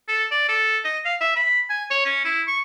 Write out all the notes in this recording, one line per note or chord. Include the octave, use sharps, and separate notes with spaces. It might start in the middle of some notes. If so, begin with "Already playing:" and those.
A4
D5
A4
D#5
F5
E5
B5
G#5
C#5
C#4
E4
C#6